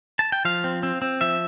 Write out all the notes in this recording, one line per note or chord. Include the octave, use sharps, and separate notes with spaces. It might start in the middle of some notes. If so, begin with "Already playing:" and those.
A5
G5
F3 F5
C4
C4
C4
F3 E5